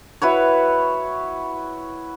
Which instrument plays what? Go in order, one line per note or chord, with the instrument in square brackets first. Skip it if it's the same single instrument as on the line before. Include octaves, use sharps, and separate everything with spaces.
[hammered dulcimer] E4 F#4 B4 C#5